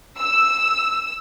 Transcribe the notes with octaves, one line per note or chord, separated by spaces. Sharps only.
E6